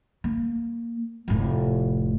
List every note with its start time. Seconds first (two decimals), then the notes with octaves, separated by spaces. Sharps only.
0.24 A#3
1.28 F1 A2